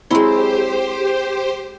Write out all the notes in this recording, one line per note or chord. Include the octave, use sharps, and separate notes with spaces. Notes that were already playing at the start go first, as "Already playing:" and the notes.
F#3 G#3 C4 E4 G4 C5 C6